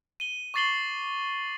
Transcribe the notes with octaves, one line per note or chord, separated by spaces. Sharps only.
D#7 G7
C#6 D6 A6 C7 F#7 G7